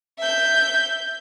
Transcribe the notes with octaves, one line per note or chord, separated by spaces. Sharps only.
E5 G6